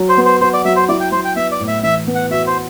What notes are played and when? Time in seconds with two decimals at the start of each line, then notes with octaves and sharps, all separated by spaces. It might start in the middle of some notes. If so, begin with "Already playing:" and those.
Already playing: F#3
0.09 C5
0.17 B3
0.25 C5
0.41 F#4 C5
0.54 D5
0.65 F#3 E5
0.76 C5
0.89 E4 D5
1.00 G5
1.12 F#3 C5
1.25 G5
1.36 B3 E5
1.52 D5
1.60 A2
1.68 E5
1.83 E3 E5
2.07 B3
2.15 F#5
2.31 F#4 E5
2.47 C5